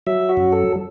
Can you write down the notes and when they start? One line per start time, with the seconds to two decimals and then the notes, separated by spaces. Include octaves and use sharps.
0.07 F#3 E5
0.29 F#4
0.37 F#2
0.52 A4